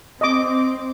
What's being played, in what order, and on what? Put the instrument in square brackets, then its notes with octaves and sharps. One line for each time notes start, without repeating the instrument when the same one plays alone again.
[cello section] C4 [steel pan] D#5 D6